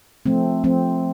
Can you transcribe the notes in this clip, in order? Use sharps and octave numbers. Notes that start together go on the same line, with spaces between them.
F3 A3 C4
F3 A3 C4